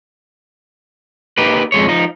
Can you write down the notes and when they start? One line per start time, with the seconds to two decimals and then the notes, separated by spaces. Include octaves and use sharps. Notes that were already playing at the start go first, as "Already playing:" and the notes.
1.38 A#3 D#4 G4 B4
1.72 F2 G#3 C#5
1.88 F3 D#4